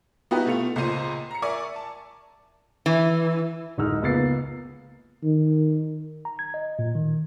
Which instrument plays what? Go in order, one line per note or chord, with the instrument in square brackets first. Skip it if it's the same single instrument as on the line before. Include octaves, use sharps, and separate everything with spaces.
[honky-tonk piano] B3 D#4 E4 F#4 G4 B4
B2 A3 F4 C#7 F7
C#2 A#2 A#4 C5 D#7
A#5 C#7
A#4 D5 E5 G#5 C#6 D6
A5
[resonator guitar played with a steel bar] E3
[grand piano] D1 G#3 D#4 E6 F6
C#2 A#3 B3 A6 C7
[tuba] D#3
[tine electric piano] A#5
G#6
D#5
A#2
D#3